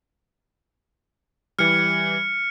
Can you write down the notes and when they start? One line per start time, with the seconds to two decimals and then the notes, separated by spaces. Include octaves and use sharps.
1.59 E3 G3 F6 C#7